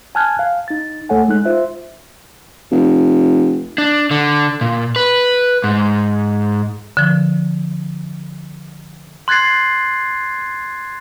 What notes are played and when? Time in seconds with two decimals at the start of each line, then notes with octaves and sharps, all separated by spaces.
0.15 G#5 A5 F6 F#6 G#6
0.39 F5
0.68 D#4 A6
1.09 D2 A3 A4 C#5 F#5 G#5
1.28 G#3 D#4 F#6
1.45 F4 C5 E5
2.71 F1
3.78 D4
4.11 D3
4.61 A#2
4.96 B4
5.64 G#2
6.97 D3 F3
9.28 C6 F#6 G#6 A6 C7